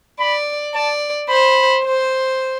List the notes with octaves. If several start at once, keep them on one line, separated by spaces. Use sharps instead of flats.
D5 B5
D5 A5
C5 B5
C5